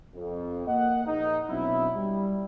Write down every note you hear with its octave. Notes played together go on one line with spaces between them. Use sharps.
F2
A#3 D#5 F#5
A#1 D#4
B2 F#3 C4 D4 E4
G3